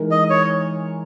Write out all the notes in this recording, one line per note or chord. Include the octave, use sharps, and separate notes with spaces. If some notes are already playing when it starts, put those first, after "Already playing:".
Already playing: E3 G#3 D#4 A#4
D#5
C#5